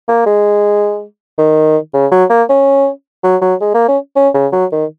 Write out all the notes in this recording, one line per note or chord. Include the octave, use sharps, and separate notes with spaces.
A#3
G#3
D#3
C#3
F#3
A#3
C#4
F#3
F#3
G#3
A#3
C#4
C#4
C#3
F#3
D#3